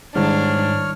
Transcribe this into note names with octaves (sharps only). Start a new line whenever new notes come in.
G#2 D#3 G3 D4 E4 C#5 F6